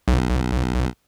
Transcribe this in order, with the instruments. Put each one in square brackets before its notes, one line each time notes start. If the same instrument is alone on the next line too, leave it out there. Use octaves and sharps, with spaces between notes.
[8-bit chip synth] B1